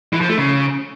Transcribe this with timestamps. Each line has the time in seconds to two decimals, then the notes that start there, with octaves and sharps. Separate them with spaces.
0.13 E3
0.21 F3
0.29 A3
0.38 C#3